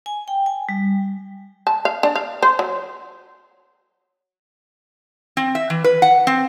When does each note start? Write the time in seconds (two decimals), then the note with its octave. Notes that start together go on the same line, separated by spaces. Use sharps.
0.06 G#5
0.28 G5
0.46 G#5
0.69 G3
1.67 A5
1.85 F5
2.03 D4
2.15 F5
2.42 C5
2.59 F#3
5.37 C4
5.55 E5
5.70 E3
5.84 B4
6.02 F#5
6.27 C4